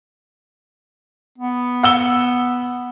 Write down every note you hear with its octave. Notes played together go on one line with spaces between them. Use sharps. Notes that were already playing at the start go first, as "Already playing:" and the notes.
B3
F#5 E6 G7